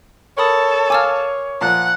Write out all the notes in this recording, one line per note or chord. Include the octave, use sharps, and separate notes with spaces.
A4 A#4 C#5 B5 D#6
F5 G#5 D6 E6 F6
A#2 F3 F#5 F#6